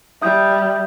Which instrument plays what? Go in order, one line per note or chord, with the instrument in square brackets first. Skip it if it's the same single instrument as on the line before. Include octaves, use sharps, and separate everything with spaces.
[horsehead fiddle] G3 [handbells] E5 D#6 G6